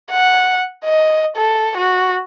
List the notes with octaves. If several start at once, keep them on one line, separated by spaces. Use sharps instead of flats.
F#5
D#5
A4
F#4